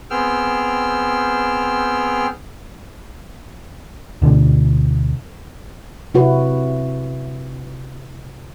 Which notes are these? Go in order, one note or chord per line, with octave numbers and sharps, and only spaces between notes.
B3 C4 G#4 G5 E6 F6
D2 B2 D3
C3 E4 F#4 B4